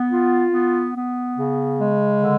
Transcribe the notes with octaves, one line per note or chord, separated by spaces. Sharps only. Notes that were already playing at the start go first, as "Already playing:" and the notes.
Already playing: B3
F4
B3
B3
C#3
G#3
D3